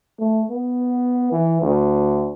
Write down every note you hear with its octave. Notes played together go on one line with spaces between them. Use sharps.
A3
B3
E3
D2